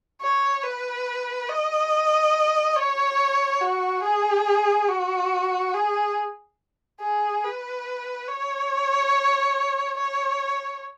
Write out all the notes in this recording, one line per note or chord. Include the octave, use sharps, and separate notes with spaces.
C#5
B4
D#5
C#5
F#4
G#4
F#4
G#4
G#4
B4
C#5
C#5